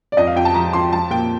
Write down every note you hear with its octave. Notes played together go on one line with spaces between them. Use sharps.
D5
F2 D#5
F5
F2 G5
A5
F3 A#5
F2 C6
F3 A5
A#2 G5